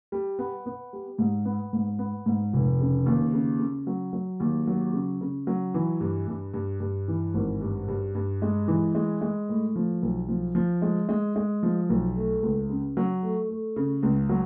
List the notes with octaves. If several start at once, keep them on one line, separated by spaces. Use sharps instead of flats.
G3
B3
B3
G3
G#2
B3
G#2
B3
G#2
F1
C#3
D#2
C#3
C#3
F#3
F#3
D#2
F#3
C#3
C#3
F#3
E3
G2
G2
G2
G2
E3
G#1
G2
G2
G2
G#3
E3
G#3
G#3
A2
F3
B1
F3
F3
G#3
G#3
G#3
F3
B1
A3
C#2
C#3
F#3
A3
A3
C#3
C#2
F#3